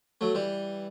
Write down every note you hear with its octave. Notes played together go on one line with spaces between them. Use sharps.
F#3 A3
E3 G3